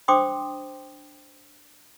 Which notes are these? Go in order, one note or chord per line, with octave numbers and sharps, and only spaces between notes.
D4 C5 G5 C6 D6 D#6